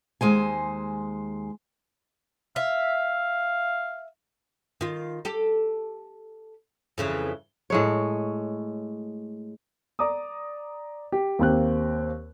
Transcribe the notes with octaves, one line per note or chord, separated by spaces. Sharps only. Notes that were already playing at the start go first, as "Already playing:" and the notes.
D#2 G#3 C5 G#5
E5 F5
D#3 F4
G4 A4
F2 C#3 E3
A2 G#3 C#5
D5 A#5 D6 D#6
G4
D#2 A#3 C4 G4 F#6